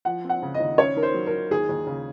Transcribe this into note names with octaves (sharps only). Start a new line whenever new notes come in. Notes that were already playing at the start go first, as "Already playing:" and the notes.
F3 F#5
C4
F#5
C#3
D#5
D#2
C#4 C#5
D#3 A#4
C5
F#3
A#4
D#3
D#2 G#4
D#2
C#3